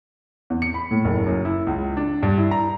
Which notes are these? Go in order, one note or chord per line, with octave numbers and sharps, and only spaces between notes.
E2
C#7
B5
A2
F#1
F#2
E4
C#2
D4
G2
E4
A#5